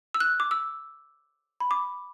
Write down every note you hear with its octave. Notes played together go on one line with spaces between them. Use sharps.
E6
F#6
D6
E6
B5
D6